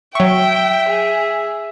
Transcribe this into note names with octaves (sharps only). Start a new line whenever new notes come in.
F#3 E5 G5 C#6
G#4